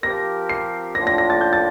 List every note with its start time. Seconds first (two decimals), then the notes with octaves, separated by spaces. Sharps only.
0.03 F3 C4 G4 A#4 A#6
0.49 C7
0.95 A2 F3 A#3 D4 F4 A#6
1.07 A#6
1.18 A#6
1.30 A6
1.41 G6
1.53 A6